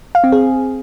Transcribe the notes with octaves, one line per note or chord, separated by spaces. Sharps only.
F5
C4
G#4